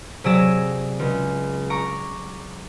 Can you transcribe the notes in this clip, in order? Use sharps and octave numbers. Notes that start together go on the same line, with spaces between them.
C3 F#3 G#4 D5 E6 A#6
C#2
A#5 C#6 D6